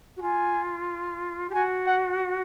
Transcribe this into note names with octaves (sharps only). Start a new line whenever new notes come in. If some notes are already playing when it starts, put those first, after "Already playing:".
F#4
F4 G#5
G4
F#4 G#5
F#5